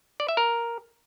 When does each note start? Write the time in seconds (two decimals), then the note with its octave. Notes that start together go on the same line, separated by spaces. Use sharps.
0.20 D5
0.29 E5
0.37 A#4